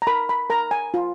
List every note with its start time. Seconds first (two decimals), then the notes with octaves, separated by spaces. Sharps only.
0.02 A#5
0.07 A#4 B5
0.29 B5
0.50 A#4 A#5
0.71 G#5
0.94 F4